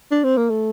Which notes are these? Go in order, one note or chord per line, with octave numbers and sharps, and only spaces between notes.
D4
C4
A#3
A3